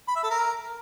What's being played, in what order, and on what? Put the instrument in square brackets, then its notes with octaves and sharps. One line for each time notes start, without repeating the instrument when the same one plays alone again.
[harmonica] B5
E5
A4
A#4